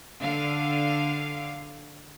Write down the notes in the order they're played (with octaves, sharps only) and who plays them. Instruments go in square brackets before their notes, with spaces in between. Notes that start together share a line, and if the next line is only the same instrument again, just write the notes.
[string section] D3 F5